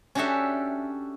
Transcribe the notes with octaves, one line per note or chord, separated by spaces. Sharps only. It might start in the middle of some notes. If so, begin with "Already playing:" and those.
C#4 D4 F#4 G4 A4 E5